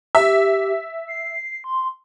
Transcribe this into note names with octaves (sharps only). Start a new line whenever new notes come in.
G4 E5
C7
C6